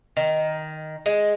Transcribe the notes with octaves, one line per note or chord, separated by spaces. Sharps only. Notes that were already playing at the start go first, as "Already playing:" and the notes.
D#3
G#3